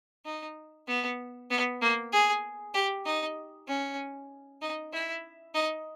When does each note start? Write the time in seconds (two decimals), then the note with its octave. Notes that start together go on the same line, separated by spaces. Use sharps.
0.25 D#4
0.87 B3
1.50 B3
1.81 A#3
2.12 G#4
2.74 G4
3.05 D#4
3.68 C#4
4.62 D#4
4.92 E4
5.55 D#4